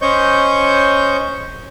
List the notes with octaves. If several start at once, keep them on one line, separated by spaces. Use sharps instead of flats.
C#4 C5 C#5 D#5 C#6 G6